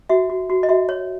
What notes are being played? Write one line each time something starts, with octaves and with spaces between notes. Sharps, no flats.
F#4 E5
F#4
F#4
D#5
F#4 E5
C#5